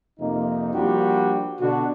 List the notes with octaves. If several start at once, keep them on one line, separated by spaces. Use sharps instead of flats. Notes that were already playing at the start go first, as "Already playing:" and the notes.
F2 C3 A#3 D#4
F3 G3 A#3 D4 F#4 G4
B2 D3 D4 F#4